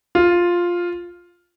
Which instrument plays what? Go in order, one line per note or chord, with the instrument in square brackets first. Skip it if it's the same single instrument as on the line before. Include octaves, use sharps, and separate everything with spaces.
[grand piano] F4